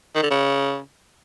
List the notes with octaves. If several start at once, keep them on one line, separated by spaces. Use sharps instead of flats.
D#3
D3
C#3